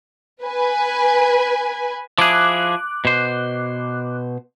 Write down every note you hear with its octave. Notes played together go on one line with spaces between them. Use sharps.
B4 G#5
F3 E4 G#4 D6 F#6
B2 C5